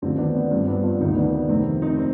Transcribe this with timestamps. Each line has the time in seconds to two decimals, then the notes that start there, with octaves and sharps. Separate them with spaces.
0.02 D#2 D3 F3 C4
0.18 B3 D4
0.35 B3
0.51 G2 F3 C4
0.67 B3 D4
0.83 D4 F4
1.00 D2 C3 D#3 C4 D#4
1.16 B3 D4
1.34 B3
1.49 F2 C3 D#3 C4
1.82 C4 D#4
1.98 C4